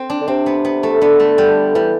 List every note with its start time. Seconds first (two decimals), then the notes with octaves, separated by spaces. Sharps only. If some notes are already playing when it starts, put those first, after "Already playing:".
Already playing: C4
0.10 D4
0.21 D3
0.28 C3 C4
0.46 B3
0.65 B3
0.83 A3
1.01 D3 B3
1.20 A3
1.38 G3
1.75 E3 G3